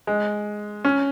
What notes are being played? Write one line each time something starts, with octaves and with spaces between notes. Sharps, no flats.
G#3
C#4